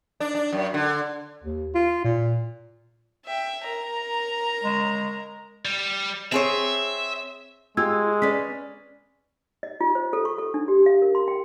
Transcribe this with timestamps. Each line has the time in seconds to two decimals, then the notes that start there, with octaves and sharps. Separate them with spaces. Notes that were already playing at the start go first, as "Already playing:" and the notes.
0.20 D4
0.35 D4
0.52 F#2
0.74 D3
1.44 D#2
1.75 F4
2.05 A#2
3.26 E5 G5
3.64 A#4 A#5
4.64 G#3
5.65 G3
6.32 C4 G#4 C#5 E5
7.77 G#3 F4 G4 E6 G#6
8.22 C#4 B4 D5 B6
9.63 D#5
9.81 F4
9.95 C5
10.13 A4
10.25 C#6
10.38 A4
10.54 D4
10.68 G4
10.86 F5
11.02 A#4
11.15 C6
11.28 G5